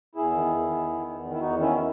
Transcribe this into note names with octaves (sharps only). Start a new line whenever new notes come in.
E2 E4 G#4
D#3
E2
D#3
E2
D#3
E2
D#3
E4
E2 D#4 F#4
D#3 C#4 E4